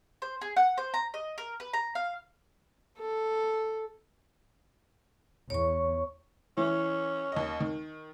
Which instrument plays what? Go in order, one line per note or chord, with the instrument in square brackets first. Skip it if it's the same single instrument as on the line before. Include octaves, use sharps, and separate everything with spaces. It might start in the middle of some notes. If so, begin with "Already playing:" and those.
[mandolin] C5
G#4
F#5
C5
A#5
D#5
A#4
B4
A#5
F5
[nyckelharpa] A4
[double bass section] E2 [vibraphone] C#5 C#6
[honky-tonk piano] E3 [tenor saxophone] C#4
[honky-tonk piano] D#2 D#5
D#3